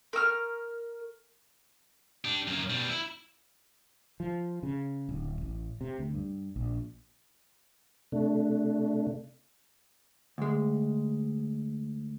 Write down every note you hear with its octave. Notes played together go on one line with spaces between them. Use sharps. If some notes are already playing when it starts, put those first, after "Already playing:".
A#4 C#6 E6 F6
D4 G4
F#2 A#3
B2 G3
E4
F3
C#3
D1
A1
C3
D2
G2
A#1
C3 A3 D4
D2 G#3